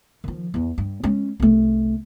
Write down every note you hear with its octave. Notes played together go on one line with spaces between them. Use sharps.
D#3 F3
E2 E3
G2
G#3 C#4
C2 A3